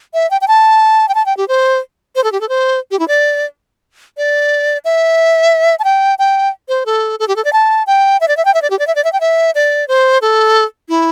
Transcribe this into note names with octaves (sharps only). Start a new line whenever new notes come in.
E5
G5
G5
A5
G5
A5
G5
G4
C5
C5
A4
G4
A4
C5
G4
E4
D5
D5
E5
A5
G5
G5
C5
A4
A4
G4
A4
D5
A5
G5
E5
D5
E5
G5
E5
D5
G4
D5
E5
D5
E5
G5
E5
D5
C5
A4
E4